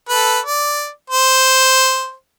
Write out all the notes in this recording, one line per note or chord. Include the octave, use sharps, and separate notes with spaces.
A4 B4
D5
C5